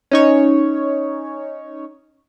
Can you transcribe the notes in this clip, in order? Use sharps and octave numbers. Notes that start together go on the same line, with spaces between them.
C#4 D#4 C#5